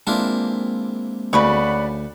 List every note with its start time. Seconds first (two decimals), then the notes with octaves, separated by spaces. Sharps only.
0.07 G#3 A#3 C4 D4 E4 F4
1.33 D2 C#3 B4 D5 F#5 B5 C#6